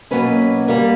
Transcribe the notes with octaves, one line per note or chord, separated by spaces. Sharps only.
B2 F#3 A#3 C#4 B4
D3 G3 A#3 A#4